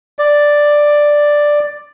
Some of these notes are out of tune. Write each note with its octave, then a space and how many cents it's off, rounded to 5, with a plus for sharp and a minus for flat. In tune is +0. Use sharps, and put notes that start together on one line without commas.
D5 +5